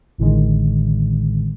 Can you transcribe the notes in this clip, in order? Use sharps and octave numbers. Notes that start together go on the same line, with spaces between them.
A1 A2 D3 D#3 G#3